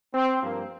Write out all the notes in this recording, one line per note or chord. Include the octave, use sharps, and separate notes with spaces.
C4
G2 F3 A#3